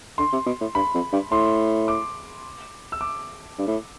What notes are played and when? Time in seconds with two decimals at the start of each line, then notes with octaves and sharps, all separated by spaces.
0.18 D3 C6
0.33 C3
0.46 B2
0.61 A2
0.75 G2 B5
0.94 F2
1.13 G2
1.31 A2 C6
1.88 D6
2.92 E6
3.01 D6
3.59 G2
3.67 A2